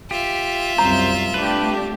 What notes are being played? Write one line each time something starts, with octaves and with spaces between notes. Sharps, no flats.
F4 G4 E5
C2 F#2 C5 A#5
A3 D4 G4 B4